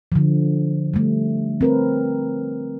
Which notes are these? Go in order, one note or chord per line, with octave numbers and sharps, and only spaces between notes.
D3 F3
G3 A3
C4 A#4 B4